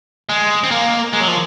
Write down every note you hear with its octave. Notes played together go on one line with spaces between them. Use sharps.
G#3
C4
A#3
G#3
F#3
F3